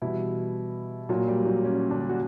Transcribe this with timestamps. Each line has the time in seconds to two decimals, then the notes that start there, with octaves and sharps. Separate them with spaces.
0.02 B2 E3 G3 E4
1.09 A#2 F#3 F#4
1.28 G3 G4
1.46 F#3 F#4
1.64 C#4
1.90 D3 D4
2.09 F#4